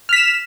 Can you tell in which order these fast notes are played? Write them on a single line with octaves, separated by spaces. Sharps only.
F6 B6 E7